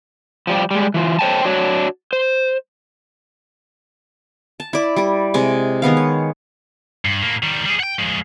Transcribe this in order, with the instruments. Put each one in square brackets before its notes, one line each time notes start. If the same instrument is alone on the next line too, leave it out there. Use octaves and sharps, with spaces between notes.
[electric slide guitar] F3 G3 G4
G3 G#3
E3 F4
C5 C#5 G5 A5
D4 F#4 C#5
C5
[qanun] A5
E4 D5
G3 D5
C3 G#3 G#5 D6
D#3 G#3 B3 F5
C#5
[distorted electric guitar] G2
A2 A#3
D#3 G3
G3 G#4
F#5 G5
F3 G#3